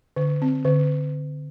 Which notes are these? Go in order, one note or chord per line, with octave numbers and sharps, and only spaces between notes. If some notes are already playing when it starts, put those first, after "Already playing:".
D3
C4
D3